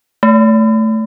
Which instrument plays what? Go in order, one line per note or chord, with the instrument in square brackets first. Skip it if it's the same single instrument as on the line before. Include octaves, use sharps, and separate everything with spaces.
[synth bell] A3